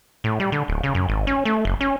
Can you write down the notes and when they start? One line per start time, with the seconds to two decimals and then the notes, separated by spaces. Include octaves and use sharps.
0.24 A2
0.40 G3
0.52 D3
0.68 D1
0.83 C#3
0.95 F#2
1.09 G#1
1.27 C#4
1.45 A3
1.65 F#1
1.81 C#4